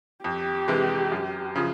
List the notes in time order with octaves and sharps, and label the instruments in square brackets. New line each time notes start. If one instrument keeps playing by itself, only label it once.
[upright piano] F2 [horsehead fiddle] G4
[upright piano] C3 E3 G#3
F#2
C#3 F3